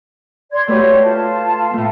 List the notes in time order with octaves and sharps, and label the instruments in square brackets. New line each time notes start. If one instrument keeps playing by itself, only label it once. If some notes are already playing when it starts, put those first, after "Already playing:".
[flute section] D5 C6 G#6
[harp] A3 B4 C6 [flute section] F#4 G4 C#5
[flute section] F4 A5
[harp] A2 A3